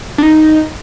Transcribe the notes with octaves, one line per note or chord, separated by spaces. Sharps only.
D4
D#4